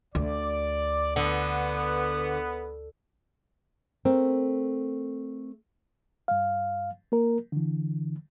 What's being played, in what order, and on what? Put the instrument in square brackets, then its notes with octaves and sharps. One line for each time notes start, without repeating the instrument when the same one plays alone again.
[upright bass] D2 [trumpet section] D5
[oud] D3 [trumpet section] B3 B4
[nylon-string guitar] A3 C4 A#4
[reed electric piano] G2 F5
A#3 A#4
D3 E3